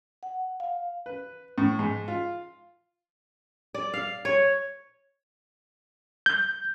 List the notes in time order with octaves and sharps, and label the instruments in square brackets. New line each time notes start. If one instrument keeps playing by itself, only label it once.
[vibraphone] F#5
F5
[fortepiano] B4
A2
G#2
F4
[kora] D5
F5
C#5
[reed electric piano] G6